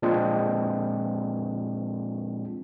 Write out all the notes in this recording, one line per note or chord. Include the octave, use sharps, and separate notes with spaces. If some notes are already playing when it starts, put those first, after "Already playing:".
A#2 F3 G#3 C4 D4